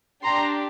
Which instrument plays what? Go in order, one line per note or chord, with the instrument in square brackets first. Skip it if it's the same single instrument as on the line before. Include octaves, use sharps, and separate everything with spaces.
[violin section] D4 G4 A#5 C6